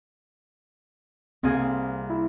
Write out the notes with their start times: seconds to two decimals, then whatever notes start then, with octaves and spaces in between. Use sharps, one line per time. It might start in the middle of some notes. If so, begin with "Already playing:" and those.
1.43 C2 A#3 C4 G#4
2.10 E4